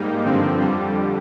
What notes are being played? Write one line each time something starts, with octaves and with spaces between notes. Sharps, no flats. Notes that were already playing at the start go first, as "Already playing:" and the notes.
Already playing: G#2 G3 A#3 D#4
G2 D3 F3 C4
F2 D3 G3